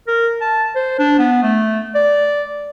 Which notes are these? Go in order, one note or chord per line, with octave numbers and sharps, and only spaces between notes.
A#4
A5
C5
D4
B3
A3
D5